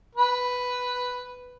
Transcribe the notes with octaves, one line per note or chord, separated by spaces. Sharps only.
B4